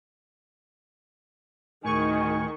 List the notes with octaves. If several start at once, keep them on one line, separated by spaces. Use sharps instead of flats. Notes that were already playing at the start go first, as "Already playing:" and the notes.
D2 A2 D#3 G#4 G#5 C#6